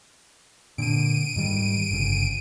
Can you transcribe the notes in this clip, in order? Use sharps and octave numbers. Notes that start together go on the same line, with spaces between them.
A#2 D3 D7 D#7
G#2 D#3 G3
G1 C#3